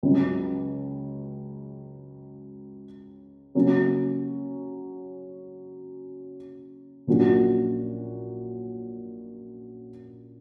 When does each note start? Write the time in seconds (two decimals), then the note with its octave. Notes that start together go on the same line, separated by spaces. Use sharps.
0.03 C#2 C#3 F#3
3.55 C#3 F#3 A#3 C#4
7.07 A#1 A#2 F#3 C#4 F#4